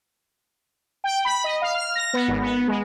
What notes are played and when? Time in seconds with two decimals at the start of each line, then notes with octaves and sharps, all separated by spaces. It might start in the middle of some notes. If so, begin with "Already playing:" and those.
1.04 G5
1.25 B5
1.44 D#5
1.62 F5
1.75 F6
1.95 A#6
2.13 B3
2.28 G#1
2.42 B3
2.68 G#3